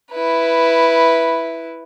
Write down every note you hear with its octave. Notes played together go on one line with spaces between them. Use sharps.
E4 B4